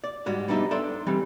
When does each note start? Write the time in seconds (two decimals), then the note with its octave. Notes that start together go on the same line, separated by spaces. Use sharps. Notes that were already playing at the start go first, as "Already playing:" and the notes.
0.04 D5
0.26 G#2 G3 G#3 F#4
0.48 G3 B3 D4 D#4 E5
0.71 D4 A4 C5 D5 E5
1.07 E3 G3 C4